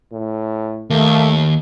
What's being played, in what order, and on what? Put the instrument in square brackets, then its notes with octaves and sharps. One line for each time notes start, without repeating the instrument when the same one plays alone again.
[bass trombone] A2
[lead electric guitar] D#2 [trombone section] A3 [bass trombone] A#3